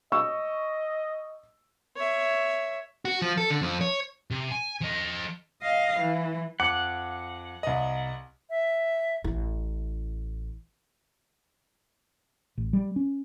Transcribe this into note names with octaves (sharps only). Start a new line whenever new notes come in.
D#5 C#6 E6
C#5 E5
F#4
F3
A4
D3
F2
C#5
C3
G#5
F3 D#5
D#5 F5
E3
F2 F#5 D6
C2 D#5
E5
A1 E4
A1
G3
C#4